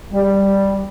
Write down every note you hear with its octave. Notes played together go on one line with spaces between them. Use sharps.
G3